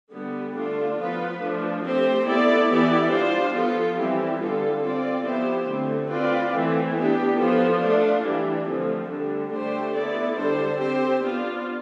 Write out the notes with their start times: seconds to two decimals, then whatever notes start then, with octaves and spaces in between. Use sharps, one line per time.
0.13 D3 G3 B3
0.56 D3 A3 D4 F4
0.98 F3 B3 F4 B4
1.41 F3 A3 D4
1.84 A3 C4 G4 C5
2.26 B3 E4 A4 D5
2.69 E3 B3 E4 G4 D5
3.11 G3 D4 F4 C5
3.55 F3 B3 F4 A4
3.98 E3 G3 C4 E4 G4
4.40 D3 G3 B3 F4 A4
4.82 C4 F4 A4 D5
5.24 F3 B3 E4 G4 C5
5.67 D3 A3 C4
6.10 C4 F4 B4 D5
6.53 E3 A3 C4
6.95 B3 D4 G4
7.38 F3 B3 F4 A4 C5
7.81 A3 D4 F4
8.23 E3 G3 D4
8.66 D3 F3 A3 C4
9.09 D3 G3 D4
9.51 D3 A3 D4 G4 C5
9.94 B3 E4 A4 D5
10.36 D3 G3 D4 A4 C5
10.79 C4 G4 C5
11.22 B3 D4 F4